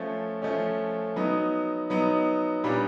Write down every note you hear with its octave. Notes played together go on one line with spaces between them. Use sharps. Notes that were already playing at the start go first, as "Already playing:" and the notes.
Already playing: F3 A3 C#4
F3 A3 C#4
F#3 B3 D#4
F#3 B3 D#4
A#2 G3 B3 D4